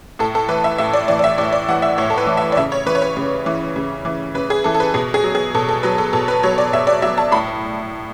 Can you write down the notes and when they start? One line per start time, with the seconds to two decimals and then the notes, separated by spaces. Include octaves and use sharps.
0.19 A2 A4
0.35 A4
0.49 E3 B4
0.64 E5
0.78 A2 E5
0.93 D5
1.08 E3 D5
1.19 D5
1.24 E5
1.38 A2 D5
1.53 D5
1.68 E3 F#5
1.82 E5
1.98 A2 C#5
2.10 A4
2.18 B4
2.27 E3
2.37 E5
2.52 D5
2.57 C#3 E5
2.72 C#5
2.86 E3 B4
2.95 C#5
3.02 B4
3.17 C#3
3.46 E3
3.76 C#3
4.05 E3
4.35 C#3 B4
4.50 G#4
4.64 E3 A4
4.75 A4
4.80 B4
4.94 B2 G#4
5.14 G#4
5.24 F#3
5.35 G#4
5.55 B2 A4
5.69 A4
5.83 F#3 B4
5.98 A4
6.13 B2 A4
6.28 B4
6.43 F#3 C#5
6.58 D5
6.73 B2 E5
6.87 D5
7.02 F#3 E5
7.18 A5
7.32 A2 B5